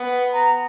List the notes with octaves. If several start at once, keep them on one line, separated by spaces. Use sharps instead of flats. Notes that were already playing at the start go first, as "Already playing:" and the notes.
Already playing: B3
A#5